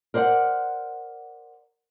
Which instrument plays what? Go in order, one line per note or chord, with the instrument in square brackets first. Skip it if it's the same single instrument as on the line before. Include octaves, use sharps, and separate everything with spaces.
[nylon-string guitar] A#4 C5 D5 E5 F#5